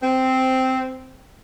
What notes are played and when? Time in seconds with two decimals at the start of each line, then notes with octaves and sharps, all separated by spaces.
0.03 C4